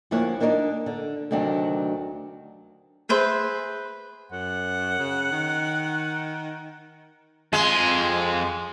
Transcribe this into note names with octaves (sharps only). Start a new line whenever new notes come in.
D2 F3 A#3 E4 C#5 F#5
A#3 D4 D#4 A#4 C#5 D#5
D3
D2 C3 D#3 F#3 C4 D4
G#4 B4 C5 E5
F#2 F#5
C#3
D#3
F2 G#3 C6